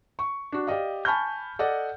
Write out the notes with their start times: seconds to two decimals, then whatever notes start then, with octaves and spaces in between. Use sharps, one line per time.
0.19 C#6
0.52 D4 F#4
0.67 G4 D5 D#5 F5
1.05 G#5 A5 B5 C#6 F6 G6
1.59 A4 D5 D#5 F#5